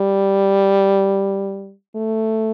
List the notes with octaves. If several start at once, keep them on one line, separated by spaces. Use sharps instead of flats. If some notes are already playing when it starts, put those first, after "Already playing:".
Already playing: G3
A3